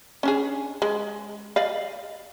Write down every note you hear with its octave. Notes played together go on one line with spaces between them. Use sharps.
C#4 D4 G#4
G#3
D5 D#5 F5